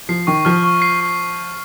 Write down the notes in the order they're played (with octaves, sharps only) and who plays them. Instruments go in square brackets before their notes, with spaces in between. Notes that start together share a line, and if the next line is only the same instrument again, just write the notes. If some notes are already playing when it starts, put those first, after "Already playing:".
[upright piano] F3 [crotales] C7
[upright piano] D#3 [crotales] C#6
[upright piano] F3 [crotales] F6
[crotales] C#6
C7
C#6